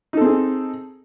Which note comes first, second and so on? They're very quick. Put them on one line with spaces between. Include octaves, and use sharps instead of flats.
D#4 A4 C4 G#4